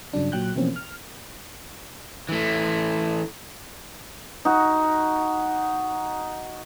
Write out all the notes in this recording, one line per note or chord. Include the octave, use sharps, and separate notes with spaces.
G2 C#3 F#3 D4
A#2 F#3 G5 F#6 G6
B2 E3 F3 A#3 C4 C#4
F6
E3 A3
D#4 F#4